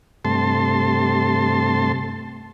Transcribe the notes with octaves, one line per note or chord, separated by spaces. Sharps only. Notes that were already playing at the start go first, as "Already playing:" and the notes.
G2 C3 A3 A5 C6